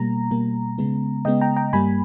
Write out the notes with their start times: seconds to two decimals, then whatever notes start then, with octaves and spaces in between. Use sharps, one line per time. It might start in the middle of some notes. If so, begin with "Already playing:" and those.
Already playing: B2 G3 A#3 A#5
0.31 B2 G3 A#3
0.78 C#3 G#3 B3
1.25 C#3 G#3 B3 D#5 G5
1.41 G5 A#5
1.57 G5 A#5
1.73 G2 G3 A#3 G#5 B5